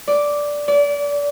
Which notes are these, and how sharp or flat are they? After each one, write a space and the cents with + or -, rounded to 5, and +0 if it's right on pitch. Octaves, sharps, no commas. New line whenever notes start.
D5 -5
D5 -30